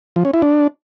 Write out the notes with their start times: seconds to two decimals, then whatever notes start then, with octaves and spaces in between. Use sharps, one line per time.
0.16 F3
0.25 C#4
0.34 E4
0.42 D4